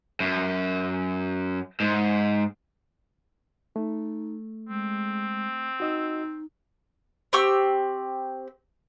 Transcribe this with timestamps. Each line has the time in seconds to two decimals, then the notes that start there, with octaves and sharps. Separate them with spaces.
0.20 F#2
1.80 G#2
3.76 A3 D#4
4.69 G#3 C4
5.80 D#4 F#4 D#5 E6
7.33 C4 G4 C#6 E6